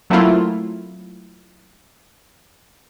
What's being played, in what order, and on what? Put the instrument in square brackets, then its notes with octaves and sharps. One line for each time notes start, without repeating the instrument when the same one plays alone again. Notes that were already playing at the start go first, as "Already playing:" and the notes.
[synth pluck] F#3 A3 A#3 C4 E4 F4